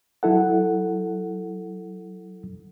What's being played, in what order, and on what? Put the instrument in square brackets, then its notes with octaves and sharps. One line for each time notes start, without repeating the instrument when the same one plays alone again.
[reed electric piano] F#3 E4 A4 F#5